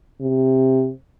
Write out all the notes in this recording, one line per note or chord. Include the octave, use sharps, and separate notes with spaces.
C3